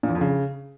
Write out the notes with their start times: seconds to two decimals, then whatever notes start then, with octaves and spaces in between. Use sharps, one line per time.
0.03 A#2
0.09 E2
0.15 F2
0.21 C#3